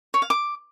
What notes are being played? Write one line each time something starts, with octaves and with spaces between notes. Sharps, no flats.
C#5
F5
D6